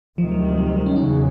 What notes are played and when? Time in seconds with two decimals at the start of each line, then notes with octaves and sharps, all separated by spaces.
0.18 D2 C3 D#3 F3
0.31 F#3
0.45 G3
0.58 G3
0.67 F#3
0.76 G3
0.86 C#4
0.96 E2 C#3 F#3 D#4